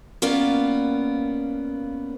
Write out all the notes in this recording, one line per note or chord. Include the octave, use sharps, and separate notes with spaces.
A#3 B3 C#4 F4 D5